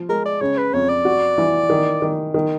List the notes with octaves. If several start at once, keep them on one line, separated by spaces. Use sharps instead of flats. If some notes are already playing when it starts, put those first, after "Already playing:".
Already playing: F3
G#3 A#4
D5
C#3 C#5
B4
F2 C#5
D5
F#4
E3
D#3
D#3
D#3